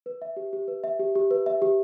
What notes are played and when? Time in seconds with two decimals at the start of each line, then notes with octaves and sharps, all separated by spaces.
0.06 B4
0.22 E5
0.37 G4
0.53 G4
0.68 B4
0.84 E5
0.99 G4
1.15 G4
1.31 B4
1.46 E5
1.62 G4